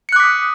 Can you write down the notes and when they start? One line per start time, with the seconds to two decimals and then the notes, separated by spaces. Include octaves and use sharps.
0.09 C#7
0.12 F#6
0.16 D6
0.20 B6
0.24 D#6